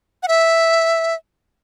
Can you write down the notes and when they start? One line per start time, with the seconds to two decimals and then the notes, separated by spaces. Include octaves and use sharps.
0.23 F#5
0.28 E5